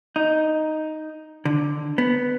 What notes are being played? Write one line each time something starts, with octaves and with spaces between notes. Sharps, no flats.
D#4
D3
B3